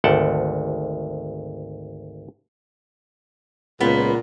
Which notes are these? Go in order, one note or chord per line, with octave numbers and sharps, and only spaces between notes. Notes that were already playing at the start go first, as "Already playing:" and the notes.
G#1 D2 F#5 G5 A5
C#2 A#2 B3